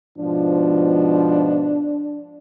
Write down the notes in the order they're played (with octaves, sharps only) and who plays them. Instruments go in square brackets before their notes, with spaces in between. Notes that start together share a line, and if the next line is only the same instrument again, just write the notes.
[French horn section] G#2 B2 F3 [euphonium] D4